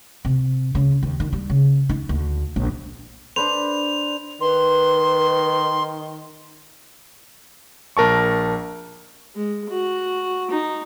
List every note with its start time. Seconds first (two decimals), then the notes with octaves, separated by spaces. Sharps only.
0.25 C3
0.75 C#3
1.03 D#2
1.20 D#3
1.33 G3
1.50 C#3
1.89 D#4
2.09 D2
2.56 A#1
3.36 D4 B4 C5 F7
4.41 D#3 B4 C6
7.97 A#1 A#4 A5 C#6
9.35 G#3
9.69 F#4
10.50 D#4